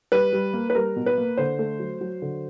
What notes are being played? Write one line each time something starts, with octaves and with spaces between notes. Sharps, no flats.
G3 B4
G3
A#3
B4
G3 A#4
B2
B4
A#3
D3 C5
A3
F#3
F#3
D3